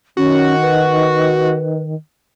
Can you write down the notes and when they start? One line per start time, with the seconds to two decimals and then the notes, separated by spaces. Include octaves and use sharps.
0.17 D#3 C#4 F#4
0.62 B4